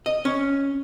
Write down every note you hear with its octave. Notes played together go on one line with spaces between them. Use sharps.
D#5
C#4